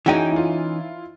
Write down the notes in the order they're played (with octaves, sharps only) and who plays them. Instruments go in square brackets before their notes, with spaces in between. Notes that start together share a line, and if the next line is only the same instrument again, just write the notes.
[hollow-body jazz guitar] E3 C#4 D#4 [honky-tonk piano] F#4 G#4 G5
[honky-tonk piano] E4 F4